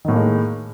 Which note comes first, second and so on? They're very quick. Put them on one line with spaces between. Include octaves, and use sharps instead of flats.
D#3 A2 A#3 G#3